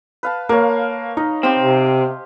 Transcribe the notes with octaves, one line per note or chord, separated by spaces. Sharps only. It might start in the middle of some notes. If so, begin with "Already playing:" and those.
B4 F5 A5
A#3 C#5 F5
D#4 D#5
C4 G4 C5 F5
C3